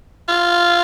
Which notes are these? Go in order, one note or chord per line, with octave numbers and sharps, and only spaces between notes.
F4